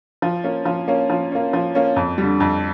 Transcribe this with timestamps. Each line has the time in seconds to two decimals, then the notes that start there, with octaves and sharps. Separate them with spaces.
0.22 F3
0.44 A#3 C#4
0.65 F3
0.88 A#3 C#4
1.10 F3
1.32 A#3 C#4
1.53 F3
1.75 A#3 C#4
1.96 F2
2.18 D3 G3
2.40 F2